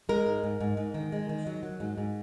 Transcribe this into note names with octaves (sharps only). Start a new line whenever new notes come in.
G#3 A#4
G#2
G#2
G#2
G#2
D#3
G#3
D#3
F#3
F#3
G#2
G#2